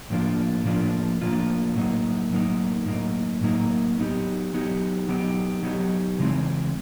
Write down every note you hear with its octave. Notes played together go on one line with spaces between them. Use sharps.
A2 F3 A#3 D4 F4
A2 F3 A#3 D4 F4
A2 F3 A#3 D4 F4
A2 F#3 A#3 D#4
A2 F#3 A#3 D#4
A2 F#3 A#3 D#4
A2 F#3 A#3 D#4
F#3 B3 D#4 G4
F#3 B3 D#4 G4
F#3 B3 D#4 G4
F#3 B3 D#4 G4
C#3 E3 G#3 C4